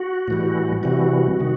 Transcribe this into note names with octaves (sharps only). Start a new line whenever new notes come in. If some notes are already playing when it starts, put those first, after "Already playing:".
Already playing: F#4
A2 E3 G3
C3 E3 G3 F#4
C3 D#3